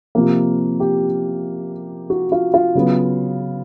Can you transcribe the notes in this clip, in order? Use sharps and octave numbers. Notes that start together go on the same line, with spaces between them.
C3 F3 A#3
G4
F#4
F4
F4
C#3 F#3 B3